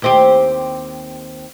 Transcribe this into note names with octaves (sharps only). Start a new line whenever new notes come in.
D#2 C4 G4